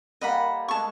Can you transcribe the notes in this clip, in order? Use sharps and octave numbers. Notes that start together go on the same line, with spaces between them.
G3 A#3 A4 D#5 F#5 B5
G#3 A3 G#4 A5 C#6